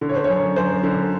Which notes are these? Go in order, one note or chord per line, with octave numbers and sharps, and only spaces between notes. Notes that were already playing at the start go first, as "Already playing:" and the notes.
D3
C#5
C5
F#2 C#5
F#2 C5
D3